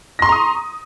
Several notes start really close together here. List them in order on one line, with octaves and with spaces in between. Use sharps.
A#6 C6 C#6 A#5 D#6